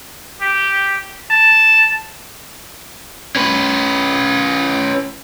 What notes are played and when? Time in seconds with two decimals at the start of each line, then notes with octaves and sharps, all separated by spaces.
0.41 G4
1.30 A5
3.36 C#4 B4